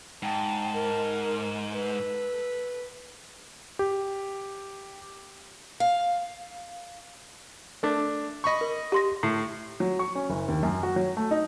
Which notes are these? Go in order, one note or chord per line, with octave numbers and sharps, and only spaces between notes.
G#2 G5 A5
A#4
A4 B4
G4
F5
A3 D4
D#5 B5 C#6
A#4
G4 C6 A#6
A2 C7
F#3
C#6
C#4
F#1
D#2
F#2
F#4
F#3
A3
D#4